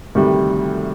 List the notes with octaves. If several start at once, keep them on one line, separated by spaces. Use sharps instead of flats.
D2 C3 D#3 G3